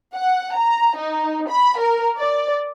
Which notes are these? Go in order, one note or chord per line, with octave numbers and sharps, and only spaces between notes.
F#5
A#5
D#4
B5
A#4
D5